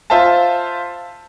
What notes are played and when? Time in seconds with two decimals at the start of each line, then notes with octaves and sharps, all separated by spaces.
0.10 F4 C5 E5 F5 A5